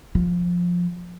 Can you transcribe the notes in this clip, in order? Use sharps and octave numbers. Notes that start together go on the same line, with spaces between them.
F3